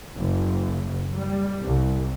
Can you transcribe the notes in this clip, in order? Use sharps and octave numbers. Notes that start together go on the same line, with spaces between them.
F#1
G3
C2